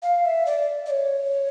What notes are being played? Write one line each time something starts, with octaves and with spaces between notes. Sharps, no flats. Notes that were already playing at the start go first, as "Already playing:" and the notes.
F5
E5
D5
D5
C#5